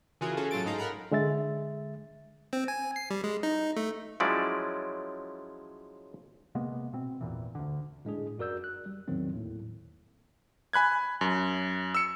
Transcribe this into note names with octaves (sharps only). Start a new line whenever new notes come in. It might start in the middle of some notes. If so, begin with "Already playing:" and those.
C#3 E3 F4 F#4 G#4 A#4
C#4 F4 F#4 G#4 A4
A2 F#3 F4 A4 A6 D7
G#2 G#3 D#4 A4 F5 A#5
A#4 F#5 A#5 B5
D3 G#3 E5 A6
C4
G#5
C7
G3
G#3
D#4
A3
F3 F#3 G#3 C#4 E4 D5
C3 G#3 A#3 B3
B2 C4
G#1 E2 A#2 E3
D2 D3
A2 G#3 D4 G#4
F#2 F#4 A#4 D5 E6 G6
F#6
G3
E2 A2 D#3 F#3 C4
D#2 A2
G#5 B5 F#6 G#6
F#2
E6 C#7